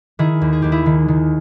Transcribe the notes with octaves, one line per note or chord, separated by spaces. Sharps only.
D#3 E4 G#4
D#2
G#4
D#2 G4
E4 G#4
D#3
D#3